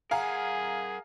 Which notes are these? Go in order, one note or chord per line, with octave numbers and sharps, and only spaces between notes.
G#4 A#4 F5 F#5 G#5 A#5